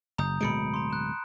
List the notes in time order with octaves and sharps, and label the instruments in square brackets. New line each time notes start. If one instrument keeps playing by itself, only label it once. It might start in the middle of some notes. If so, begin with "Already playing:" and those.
[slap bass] F#1 [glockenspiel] A#5 D#6 G6
[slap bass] D1 B2 G#3 [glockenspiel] B5 C#7 D7
[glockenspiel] A#5 C6
F#6 E7